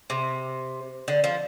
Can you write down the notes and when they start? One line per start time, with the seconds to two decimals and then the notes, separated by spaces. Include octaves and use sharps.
0.10 C3
1.08 D3
1.24 F3